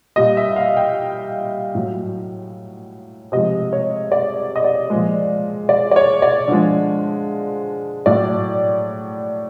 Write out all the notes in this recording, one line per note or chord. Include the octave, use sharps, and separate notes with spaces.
A#2 G3 D#5
E5
F5
G5
A2 F#3
C3 F3 G#3 D#5
C#5
D5
D#5
D5
A#2 F3 G#3
D5
D5
C#5
D5
D3 F3 G#3
A2 F#3 D5